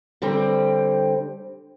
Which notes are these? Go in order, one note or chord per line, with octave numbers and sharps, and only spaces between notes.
D3 G3 C4